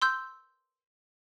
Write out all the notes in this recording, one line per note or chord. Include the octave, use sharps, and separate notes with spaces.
C6 E6 G6